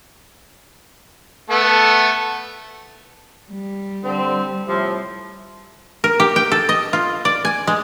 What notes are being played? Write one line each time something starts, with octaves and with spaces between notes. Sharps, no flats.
A3 B3 A4
G3
D3 C4
A2 C3 F3
A#4
G4
G5
A4
D#5
F4
D5
G#5
G#3